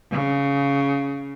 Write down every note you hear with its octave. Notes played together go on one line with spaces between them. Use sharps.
C#3